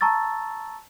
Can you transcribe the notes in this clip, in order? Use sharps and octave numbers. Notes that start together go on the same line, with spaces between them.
A5 A#5 C#6 E6 A6